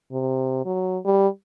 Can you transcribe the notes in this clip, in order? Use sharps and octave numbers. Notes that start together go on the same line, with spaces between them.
C3
F#3
G3